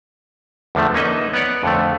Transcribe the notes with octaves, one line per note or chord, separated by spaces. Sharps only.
E2 D3 F3 A3
A#3 C#4 D#4 B4 D#5 E5
B3 B4 C#5 D5 F#5
F2 D3 A3